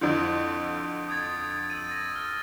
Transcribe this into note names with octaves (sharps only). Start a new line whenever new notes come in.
F2 D3 E4 G6 C#7 D7
D#6 G#6 A6
E6 A6 D#7
A6 A#6
F6